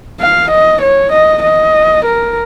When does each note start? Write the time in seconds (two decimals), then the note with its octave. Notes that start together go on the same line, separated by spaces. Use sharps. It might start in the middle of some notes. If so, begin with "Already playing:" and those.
0.20 F5
0.51 D#5
0.82 C#5
1.12 D#5
1.43 D#5
2.05 A#4